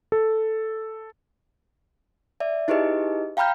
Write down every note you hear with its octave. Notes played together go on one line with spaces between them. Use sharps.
A4
D5 E5
D#4 E4 G4 G#4 B4 D#5
F5 G5 A#5 B5 F6 G6